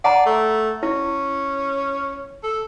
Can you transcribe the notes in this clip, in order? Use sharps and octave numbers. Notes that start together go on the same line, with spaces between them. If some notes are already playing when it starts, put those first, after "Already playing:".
D5 F#5 A5 A#5
A3
C#4 E4
A4